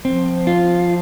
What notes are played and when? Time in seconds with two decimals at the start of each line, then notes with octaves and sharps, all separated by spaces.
0.05 F3 C4
0.47 F4